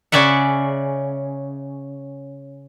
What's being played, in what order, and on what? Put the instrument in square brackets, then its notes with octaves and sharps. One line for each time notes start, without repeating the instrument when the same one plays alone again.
[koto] C#3 C#4 D5 E5 F#5